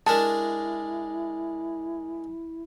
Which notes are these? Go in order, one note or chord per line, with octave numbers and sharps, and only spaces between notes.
G#3 D4 E4 A#4 A5